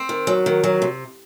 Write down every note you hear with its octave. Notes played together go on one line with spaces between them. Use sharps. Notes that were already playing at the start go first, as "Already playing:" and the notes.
Already playing: C4
D#3
F#3
D#3
F#3
C3